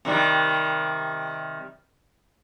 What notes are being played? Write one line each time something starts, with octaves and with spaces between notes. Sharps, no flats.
C3 D#3 G3